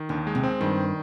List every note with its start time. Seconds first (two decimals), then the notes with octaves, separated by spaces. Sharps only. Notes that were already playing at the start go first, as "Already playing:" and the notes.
Already playing: D#3
0.09 D#2 D3
0.27 G#3
0.35 C3
0.44 C4
0.60 G2 D#3